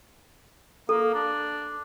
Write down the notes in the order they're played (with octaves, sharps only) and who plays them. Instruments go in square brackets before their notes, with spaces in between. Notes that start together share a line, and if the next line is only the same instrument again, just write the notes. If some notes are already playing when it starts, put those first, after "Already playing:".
[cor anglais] A#3 [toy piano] A4
[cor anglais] D4